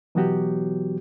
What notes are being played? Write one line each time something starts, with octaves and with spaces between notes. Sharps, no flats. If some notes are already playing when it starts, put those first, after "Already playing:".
B2 E3 F#3 B3 F#4 G4